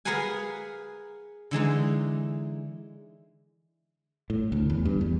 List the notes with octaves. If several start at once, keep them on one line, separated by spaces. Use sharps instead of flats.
G#4 A#4 B4 F5 F#5 G#5
D3 E3 G#3 D#4
A2
D2
E2
G2
E2